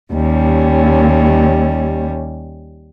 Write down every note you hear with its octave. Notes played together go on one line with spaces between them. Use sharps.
D#2 G3 C#4